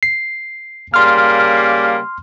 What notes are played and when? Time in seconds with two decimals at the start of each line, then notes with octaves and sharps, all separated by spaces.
0.03 C7
0.94 C#3 G3 A#3 C6 F6